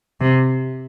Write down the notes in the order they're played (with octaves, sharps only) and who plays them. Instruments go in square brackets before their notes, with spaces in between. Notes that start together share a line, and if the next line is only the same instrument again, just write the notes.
[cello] C3